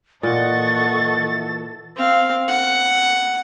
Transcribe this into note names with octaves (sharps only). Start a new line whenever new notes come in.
A#2 E3 A4 D#5 F#5 C#6 A6
C4 F5
F#5